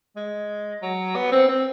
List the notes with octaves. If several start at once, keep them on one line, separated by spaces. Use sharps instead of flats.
G#3
F#3
B3
C4
C4